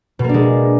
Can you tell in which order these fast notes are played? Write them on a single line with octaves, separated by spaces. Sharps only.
B2 A#3 D4 G#3